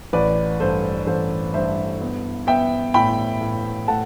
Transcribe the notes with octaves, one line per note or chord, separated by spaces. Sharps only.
A1 B4 D5
G2 A4 C5
A1 A4 C5
G2 C5 E5
B3
B3 E5 G5
A2 G5 B5
A2
A3 F#5 A5